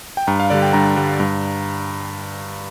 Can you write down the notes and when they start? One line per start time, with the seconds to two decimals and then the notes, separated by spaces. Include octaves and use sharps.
0.17 G5
0.27 G2 A#5
0.40 F5
0.50 D3 G3 D5
0.62 G5
0.73 G2 A#5
0.96 D3 G3
1.20 G2